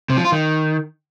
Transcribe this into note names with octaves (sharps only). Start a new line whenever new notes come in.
C3
F3
F4
D#3